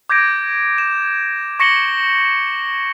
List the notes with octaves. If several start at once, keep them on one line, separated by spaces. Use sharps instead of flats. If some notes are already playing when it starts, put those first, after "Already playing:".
D6 G6 G#6 A#6 D7
E7
C#6 A#6 C#7 F#7 G7